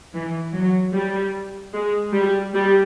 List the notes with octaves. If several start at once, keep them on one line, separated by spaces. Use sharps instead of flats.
E3
F#3
G3
G#3
G3
G3